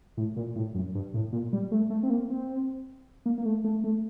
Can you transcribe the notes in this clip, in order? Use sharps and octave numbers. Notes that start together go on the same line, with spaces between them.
A2
A#2
A2
F#2
G2
A2
A#2
G3
A3
A3
C4
A#3
C4
A#3
A#3
A3
A3
A3